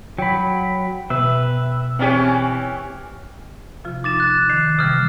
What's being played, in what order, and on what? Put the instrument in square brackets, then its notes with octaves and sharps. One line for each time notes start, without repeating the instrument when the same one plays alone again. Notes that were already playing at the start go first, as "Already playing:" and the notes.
[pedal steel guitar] F#3 B5 [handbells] G5
[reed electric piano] B2 [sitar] B4 [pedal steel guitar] E5
[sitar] E3 C#4 G4 [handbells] C4 C#5
[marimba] C3 F3 F4
[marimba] D#4 [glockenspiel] D6 A6 E7
[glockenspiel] F#6 A6
[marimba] D#3 [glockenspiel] C7
[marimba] C3 E3 G3 [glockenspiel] D#6 F6